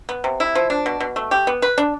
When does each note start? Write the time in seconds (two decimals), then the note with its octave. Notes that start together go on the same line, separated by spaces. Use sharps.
0.09 B3
0.24 C3
0.40 E4
0.55 F3
0.70 D4
0.86 B2
1.00 B2
1.16 A3
1.31 G4
1.47 B3
1.62 B4
1.78 D4